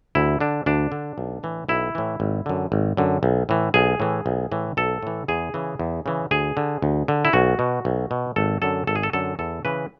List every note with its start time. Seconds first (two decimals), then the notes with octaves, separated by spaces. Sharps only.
0.15 D2 E4
0.41 D3 D4
0.66 D2 D4
0.92 D3
1.18 B1
1.43 A2 E3
1.69 B1 E4
1.95 A2 E3
2.20 G#1
2.46 F#2 D3
2.72 G#1
2.97 F#2 D3
3.23 B1
3.49 A2 E3
3.74 B1 G#4
4.00 A2 E3
4.26 B1
4.52 A2 E3
4.77 B1 A4
5.02 A2 E3
5.28 E2 G#4
5.54 C#3 E3
5.79 E2
6.06 C#3 E3
6.31 D2 G#4
6.57 D3
6.82 D2
7.08 D3
7.25 E4
7.33 B1 F#4
7.59 B2
7.85 B1
8.11 B2
8.36 G#1 A4
8.62 F#2 D3 A4
8.87 G#1 A4
8.95 G#4
9.03 A4
9.13 F#2 D3 A4
9.39 E2 A4
9.65 C#3 E3 B4